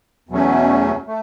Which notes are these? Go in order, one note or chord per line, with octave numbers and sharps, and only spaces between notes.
E2 B2 F#3 A3 C#4
A3